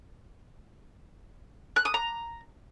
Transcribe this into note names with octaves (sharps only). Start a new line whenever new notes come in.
F#6
D#6
A#5